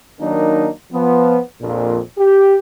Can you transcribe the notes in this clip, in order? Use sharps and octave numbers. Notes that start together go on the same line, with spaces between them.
D#3 F#3 A#3 D4 D#4
F3 B3
A#1 F2 A#2
G4